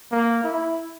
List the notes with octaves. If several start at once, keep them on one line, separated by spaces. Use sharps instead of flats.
A#3
E4